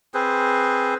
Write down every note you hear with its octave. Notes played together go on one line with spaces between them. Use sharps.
C4 G#4 B4 C5